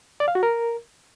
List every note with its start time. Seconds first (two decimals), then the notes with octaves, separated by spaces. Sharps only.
0.20 D5
0.28 F5
0.35 F#4
0.43 A#4